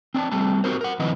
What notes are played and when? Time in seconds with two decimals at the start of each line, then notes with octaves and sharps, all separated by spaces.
0.14 C4 D4 D5 A5
0.32 G3 A3 C4 A5
0.64 C4 F#4 G4 A#4 C5
0.81 A#4 F#5
0.99 D#3 F3 C4 E4 B4 D#5